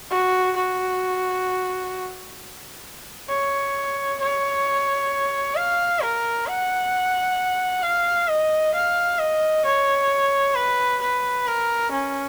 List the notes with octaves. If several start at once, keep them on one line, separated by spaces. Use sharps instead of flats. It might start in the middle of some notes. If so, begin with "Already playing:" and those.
F#4
F#4
C#5
C#5
F5
A#4
F#5
F5
D#5
F5
D#5
C#5
B4
B4
A#4
C#4